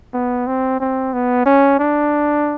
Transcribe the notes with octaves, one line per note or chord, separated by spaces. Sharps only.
B3
C4
C4
B3
C#4
D4